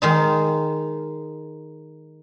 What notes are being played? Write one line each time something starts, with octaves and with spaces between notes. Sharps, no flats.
D#3 G#3 D#4